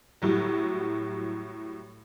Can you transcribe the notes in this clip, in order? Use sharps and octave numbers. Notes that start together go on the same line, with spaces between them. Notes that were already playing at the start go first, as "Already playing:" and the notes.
A2 F#3 G3